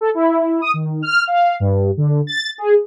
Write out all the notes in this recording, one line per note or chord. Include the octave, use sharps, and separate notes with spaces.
A4
E4
D#6
D#3
F6
F5
G2
D3
A6
G#4